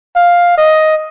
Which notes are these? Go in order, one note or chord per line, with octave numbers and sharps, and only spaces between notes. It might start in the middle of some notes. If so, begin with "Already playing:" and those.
F5
D#5